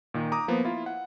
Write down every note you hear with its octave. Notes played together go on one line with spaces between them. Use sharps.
A#2 D#3
A#5 D6 D#6
F3 A#3 B3
E4 F4
F#5